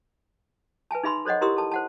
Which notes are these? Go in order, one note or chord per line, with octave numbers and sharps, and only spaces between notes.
B4 E5 G#5 A5
D#4 G#4 E5 B5 C6 E6
A4 C5 C#5 D#5 F#5
E4 G4 A#4 C6 D#6 E6
A4 A5
C5 F#5 A5